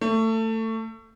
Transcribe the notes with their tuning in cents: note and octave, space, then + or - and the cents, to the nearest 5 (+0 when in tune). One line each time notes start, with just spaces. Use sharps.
A3 +25